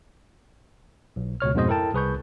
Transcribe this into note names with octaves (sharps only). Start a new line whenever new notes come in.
B1
C#2 B2 C#5 F6
F2 G#2 B2 G#3 C5 D#5
E4 A4 A#4 G5 A5
C2 G#4 B4 C#6 G6